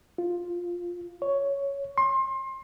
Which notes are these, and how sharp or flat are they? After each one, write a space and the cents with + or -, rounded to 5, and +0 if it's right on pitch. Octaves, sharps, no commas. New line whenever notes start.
F4 +5
C#5 +5
C6 +30